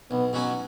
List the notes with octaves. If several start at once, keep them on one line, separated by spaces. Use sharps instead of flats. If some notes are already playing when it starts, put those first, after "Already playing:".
B1 B3
B2 F#3 C#4 F#4